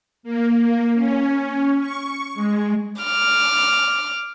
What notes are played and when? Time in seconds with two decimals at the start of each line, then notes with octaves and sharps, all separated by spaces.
0.23 A#3
0.62 A#3
0.95 C#4
1.80 C#6
2.34 G#3
3.02 D6 F6